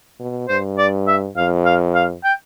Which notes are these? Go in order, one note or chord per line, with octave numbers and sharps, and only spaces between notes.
B2
G2 C5
D5
E5
F2 F5
F5
F5
G5